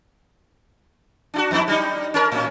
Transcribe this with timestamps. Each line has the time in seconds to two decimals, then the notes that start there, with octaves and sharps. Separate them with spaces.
1.34 D4 E4 F#4
1.51 F2 B3 E4
1.68 G3 D#4
2.14 C#4 A#4
2.32 A2 C#4